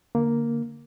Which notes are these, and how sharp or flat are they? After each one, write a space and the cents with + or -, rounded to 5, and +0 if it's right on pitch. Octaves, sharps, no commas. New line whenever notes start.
D3 +0 A#3 +0